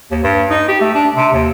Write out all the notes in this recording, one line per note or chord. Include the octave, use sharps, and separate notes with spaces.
D#2
G2
D#4
G4
A3
D4
C3
D#2